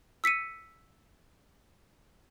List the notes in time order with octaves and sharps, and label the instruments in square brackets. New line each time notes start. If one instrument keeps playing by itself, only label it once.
[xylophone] E6 B6 C#7 D#7